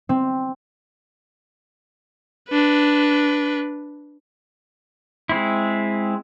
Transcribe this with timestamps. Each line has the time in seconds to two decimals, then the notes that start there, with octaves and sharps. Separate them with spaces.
0.09 C4
2.50 D4 B4
5.29 G#3 C4 E4